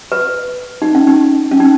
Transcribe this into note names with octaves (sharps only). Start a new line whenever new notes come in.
B4
D#4
C#4
D#4
C#4
D#4